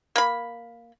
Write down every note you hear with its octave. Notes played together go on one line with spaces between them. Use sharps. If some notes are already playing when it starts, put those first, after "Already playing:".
A#3 B5